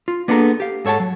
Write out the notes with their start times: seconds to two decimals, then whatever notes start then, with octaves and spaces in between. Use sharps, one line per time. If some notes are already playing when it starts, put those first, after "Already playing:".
0.08 F4
0.28 A#3 B3 D4 G#4 A4 A#5
0.60 G4 F5
0.85 G#2 A4 C#5 F#5 A5
1.00 F#3